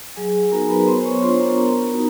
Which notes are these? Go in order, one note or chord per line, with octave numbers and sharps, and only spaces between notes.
F#3 G#4 G#5
B3 D#4 F#4 A#4 A#5
B4 B5
B3 C5 C6
C#5 C#6
D4 F4 C5 C6
A#4 A#5
B3
D#4 F#4